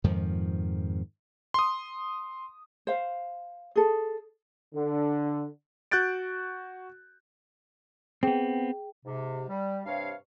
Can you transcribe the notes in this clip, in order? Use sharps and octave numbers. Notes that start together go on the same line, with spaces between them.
F2 G#2 D#3 F3
C6 D#6
C5 F5
G#4 A4
D3
F#4 F#6 G6 A6 D7
B3 C4 G#4 G5
G#2 C3
G3
G2 C3 C#5 F5